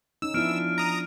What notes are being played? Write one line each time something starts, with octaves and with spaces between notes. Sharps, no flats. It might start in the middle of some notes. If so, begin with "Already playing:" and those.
C#4 D#4 E6
F3 B3 D4 E4 F6 D7
A#5 D#6